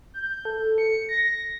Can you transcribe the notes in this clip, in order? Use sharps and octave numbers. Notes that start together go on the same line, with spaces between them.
G6
A4
C#7
A#6